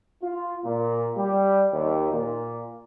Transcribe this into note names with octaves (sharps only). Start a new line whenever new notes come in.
F4
A#2
G3
D#2
A#2